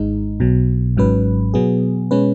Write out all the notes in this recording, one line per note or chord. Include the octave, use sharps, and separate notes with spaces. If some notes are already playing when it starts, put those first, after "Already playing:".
Already playing: G#1 G#2 G#3 D#4
B1 B2 F#3
G#1 G#2 F#3 C#4 B4
B2 F#3 B3 G#4
B2 G#3 C#4 B4